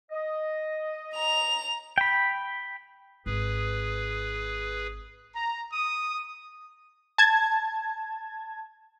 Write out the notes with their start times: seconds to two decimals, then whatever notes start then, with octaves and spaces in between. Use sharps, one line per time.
0.11 D#5
1.15 A#5 F7
1.98 G5 B5
3.26 G#1 G#4 B4
5.34 A#5
5.73 D#6
7.18 A5 G#6